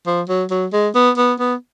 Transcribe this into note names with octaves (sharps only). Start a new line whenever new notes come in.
F3
F#3
F#3
G#3
B3
B3
B3